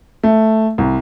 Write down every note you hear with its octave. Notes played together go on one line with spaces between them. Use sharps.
A3
C2